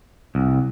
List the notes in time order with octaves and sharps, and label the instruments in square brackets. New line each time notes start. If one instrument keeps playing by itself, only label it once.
[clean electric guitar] C2